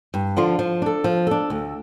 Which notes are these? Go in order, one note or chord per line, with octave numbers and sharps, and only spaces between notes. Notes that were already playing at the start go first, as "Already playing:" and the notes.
G2
D3 F3 D4 F4
F3
D4 A4
F3
D4 A4
D2